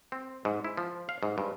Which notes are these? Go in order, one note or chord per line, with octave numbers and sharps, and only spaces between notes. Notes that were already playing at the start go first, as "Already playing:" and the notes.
C4
G#2
E4
F3
F5
G#2
G2